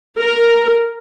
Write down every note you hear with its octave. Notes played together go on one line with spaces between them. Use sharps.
A#4